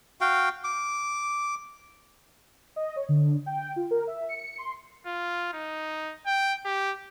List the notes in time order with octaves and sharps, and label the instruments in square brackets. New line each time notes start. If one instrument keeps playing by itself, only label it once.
[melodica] F#4 F5 G5
D6
[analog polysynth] D#5
C#5
D3
G5
F4
A#4
E5
C#7
C6
[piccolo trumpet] F4
D#4
G5
G4